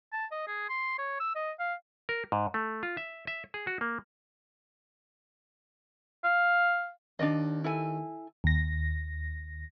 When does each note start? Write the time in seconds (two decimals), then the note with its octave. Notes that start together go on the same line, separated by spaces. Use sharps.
0.13 A5
0.32 D#5
0.47 G#4
0.69 C6
0.98 C#5
1.20 E6
1.36 D#5
1.59 F5
2.09 A#4
2.32 G#2
2.54 A3
2.83 F4
2.97 E5
3.27 E5
3.54 G#4
3.67 F#4
3.81 A#3
6.24 F5
7.19 D#2 D4 D5 D#5
7.64 E4 A4 G#5
8.44 D#2 A#6